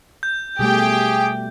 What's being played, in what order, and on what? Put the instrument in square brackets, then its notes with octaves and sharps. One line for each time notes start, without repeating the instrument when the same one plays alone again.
[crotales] G6
[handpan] B2 G3 A3 [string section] G4 G5 [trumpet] G#4